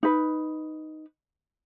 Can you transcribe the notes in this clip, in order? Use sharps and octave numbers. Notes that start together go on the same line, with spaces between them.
D#4 B4